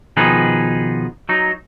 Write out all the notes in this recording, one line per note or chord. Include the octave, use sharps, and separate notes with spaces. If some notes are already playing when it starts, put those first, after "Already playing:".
B2 D#3 F3 D#4 G#4 B4
F#3 D#4